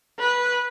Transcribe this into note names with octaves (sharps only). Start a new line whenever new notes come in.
B4